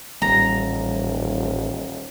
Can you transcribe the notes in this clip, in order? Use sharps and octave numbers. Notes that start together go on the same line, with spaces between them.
D#1 A1 G3 A#5